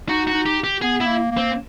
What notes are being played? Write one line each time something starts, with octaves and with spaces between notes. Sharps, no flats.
D#4 F#4
F#4
D#4
G4
G4
B3 G#4
E4
A#3
A#3
C4